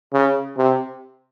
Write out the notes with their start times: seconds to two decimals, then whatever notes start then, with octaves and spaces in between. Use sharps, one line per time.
0.13 C#3
0.57 C3